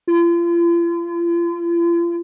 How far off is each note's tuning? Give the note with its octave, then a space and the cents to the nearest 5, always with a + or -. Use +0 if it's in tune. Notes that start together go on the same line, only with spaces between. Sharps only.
F4 -40